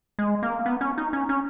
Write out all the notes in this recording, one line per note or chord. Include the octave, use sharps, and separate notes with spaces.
G#3
A#3
B3
C#4
D#4
C#4
C#4